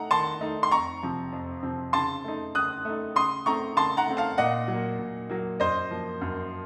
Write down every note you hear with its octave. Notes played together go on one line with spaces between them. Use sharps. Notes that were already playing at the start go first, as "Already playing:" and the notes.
Already playing: A3 D#4 F#5 A#5
D#3 A5 C6
A3 D#4
C6
F2 A#5 C#6
C3 F3 C4
F2
C3 F3 C4
C#3 A5 C6
A3 D#4
C#3 D#6 F#6
A3 D#4
C#3 C6 D#6
A3 C4 A#5 C#6
C#3 A5 C6
F#5 A#5
A3 C4
F5 A5
A#2 D#5 F#5
F#3
A#3
A#2
F#3 A#3
F#2 C5 D#5
F3 A#3
F#2